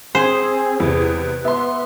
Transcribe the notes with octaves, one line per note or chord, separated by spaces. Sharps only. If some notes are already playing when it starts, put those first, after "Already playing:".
C4 G#4 C5
E2 C3 B4
B3 E5 C6